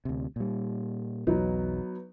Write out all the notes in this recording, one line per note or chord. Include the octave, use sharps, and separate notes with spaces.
D2 C3
A#2 G3
B1 E2 F#3 B3 D#4